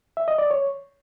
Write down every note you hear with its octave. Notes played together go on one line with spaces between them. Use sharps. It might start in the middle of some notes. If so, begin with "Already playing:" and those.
E5
D#5
D5
C#5